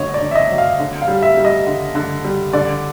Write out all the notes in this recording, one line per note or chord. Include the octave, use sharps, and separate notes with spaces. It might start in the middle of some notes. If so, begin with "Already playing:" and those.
Already playing: D3 F#3 C#5 D#5
D5
D3
E5
D#5
F#3
F5
D3
F5
G3
E5
G3
D#5
D3
D3
G3
D3 D5